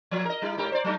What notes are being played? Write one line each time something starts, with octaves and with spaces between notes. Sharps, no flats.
A#2 F3
A#4 D#5
G3 E4
G#2 G4 A#4
C5 D5
F#3 A3 D#4